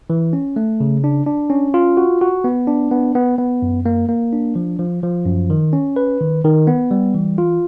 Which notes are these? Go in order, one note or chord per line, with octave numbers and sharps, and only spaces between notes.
E3
C#4
A3
C#3
D4
D4
C#4
F4
F#4
F#4
B3
D4
B3
B3
B3
F#2
A#3
A#3
D4
F3
F3
F3
F#2
D#3
C#4
B4
D#3
D#3
B3
G3
E3
F4